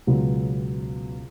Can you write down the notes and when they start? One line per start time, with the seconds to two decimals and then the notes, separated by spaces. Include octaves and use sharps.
0.07 C#2 B2 F#3 B3